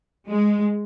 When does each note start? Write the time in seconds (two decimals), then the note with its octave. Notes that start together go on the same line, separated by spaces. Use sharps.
0.29 G#3